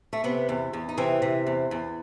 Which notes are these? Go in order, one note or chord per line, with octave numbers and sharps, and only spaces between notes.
A3
C3 B3
E2
E2
D#4
C3 E3 C4
C3
E2
E2